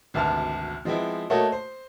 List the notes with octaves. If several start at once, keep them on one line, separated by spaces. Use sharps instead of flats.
G#1 D2 C3 B3 A5 F6
F3 G#3 B3 C4 E4
A3 A#3 F#4 A4 C#5 D#5
C5